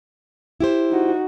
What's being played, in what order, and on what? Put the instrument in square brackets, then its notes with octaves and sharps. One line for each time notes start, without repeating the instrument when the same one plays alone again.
[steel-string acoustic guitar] E4 G4 C5
[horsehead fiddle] D#4 F#4